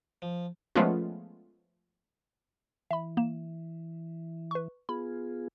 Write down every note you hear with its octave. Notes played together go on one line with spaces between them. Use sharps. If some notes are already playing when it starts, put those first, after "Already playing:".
F3
F3 G#3 A3 B3 C#4 F4
E3 E5 B5
A#3 E7
B4 C#6
B3 F4 G#4 B5